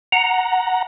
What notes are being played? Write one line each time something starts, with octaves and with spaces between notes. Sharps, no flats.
F#5 A#5